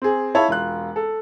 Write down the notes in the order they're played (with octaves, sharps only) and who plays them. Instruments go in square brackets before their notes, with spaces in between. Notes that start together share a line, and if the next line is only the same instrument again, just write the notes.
[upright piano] C4 G#4
E4 C#5 E5 F5 A5 B5
E1 F4 F#6
A4